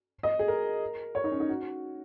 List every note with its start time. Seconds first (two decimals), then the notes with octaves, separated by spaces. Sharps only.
0.23 D#5
0.39 G#4
0.48 A#4
1.15 C#5
1.24 D#4
1.32 C#4
1.40 D#4
1.49 F#4